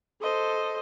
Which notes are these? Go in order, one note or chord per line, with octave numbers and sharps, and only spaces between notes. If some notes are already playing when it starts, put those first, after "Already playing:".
A4 C5 D#5